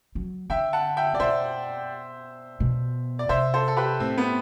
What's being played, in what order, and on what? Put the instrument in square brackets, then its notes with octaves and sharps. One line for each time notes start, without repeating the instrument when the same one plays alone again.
[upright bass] F#3
[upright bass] D3 [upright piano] E5 G5
[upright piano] F#5 A5
E5 G5
[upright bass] C3 [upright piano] D5
[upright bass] B2 [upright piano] C5 E5
[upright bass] B2
[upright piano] D5
[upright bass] C3 [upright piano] C5 E5
[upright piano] A4 C5
A4
G4 B4
[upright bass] A2 [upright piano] C4
[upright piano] B3